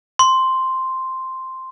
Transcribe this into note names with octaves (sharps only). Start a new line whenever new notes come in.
C6